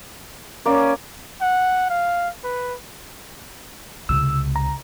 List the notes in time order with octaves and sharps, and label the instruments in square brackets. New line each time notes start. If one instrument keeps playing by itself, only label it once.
[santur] A#3 D5 [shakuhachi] C#4
[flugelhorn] F#5
F5
B4
[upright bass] C#2 C3 [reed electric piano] E6
[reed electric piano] A#5